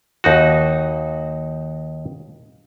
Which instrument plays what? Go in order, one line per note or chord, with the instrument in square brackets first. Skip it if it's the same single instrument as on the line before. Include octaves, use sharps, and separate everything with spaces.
[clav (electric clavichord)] D#2 D#4 F#4